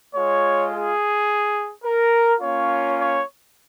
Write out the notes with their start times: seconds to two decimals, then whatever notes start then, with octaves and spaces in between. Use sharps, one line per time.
0.14 G#3 F4 C#5
0.70 G#4
1.84 A#4
2.41 A#3 C#4 F4 C#5
2.98 C#5